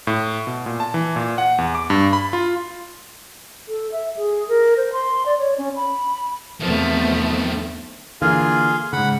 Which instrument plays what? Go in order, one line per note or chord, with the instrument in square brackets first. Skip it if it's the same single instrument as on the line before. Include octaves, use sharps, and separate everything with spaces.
[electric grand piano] A2
B2
A#2
A5
E3
A#2
F#5
E2
D6
G2
B5
F4
[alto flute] A4
E5
G#4
A#4
C5
C6
D5
C#5
C#4
B5
[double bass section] E2 B3 C4 [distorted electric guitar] D#3 A4 [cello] F3 A3
[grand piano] D3 E3 A#3 [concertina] F4 G#4 F5
[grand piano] G#2 C#3 [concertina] F#5 B5